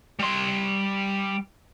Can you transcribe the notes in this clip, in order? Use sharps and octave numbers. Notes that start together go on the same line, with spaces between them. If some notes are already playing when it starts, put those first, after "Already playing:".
G3 C6